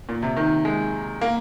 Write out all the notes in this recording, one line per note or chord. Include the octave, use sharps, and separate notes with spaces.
A#2
C3
D#3
G#3
A#3